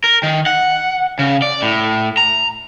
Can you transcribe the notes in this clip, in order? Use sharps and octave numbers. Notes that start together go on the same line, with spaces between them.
A#4
D#3
F#5
C#3
D5
A2
A#5